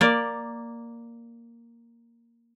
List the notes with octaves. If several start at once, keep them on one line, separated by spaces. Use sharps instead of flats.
A#3 D5